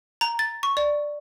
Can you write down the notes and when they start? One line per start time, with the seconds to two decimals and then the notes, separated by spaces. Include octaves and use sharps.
0.21 A#5
0.39 A6
0.63 C#6
0.77 D5